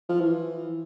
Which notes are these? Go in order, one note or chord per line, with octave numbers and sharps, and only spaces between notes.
F3
E3